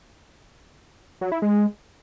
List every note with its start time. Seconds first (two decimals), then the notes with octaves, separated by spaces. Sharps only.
1.21 F#3
1.32 E4
1.42 G#3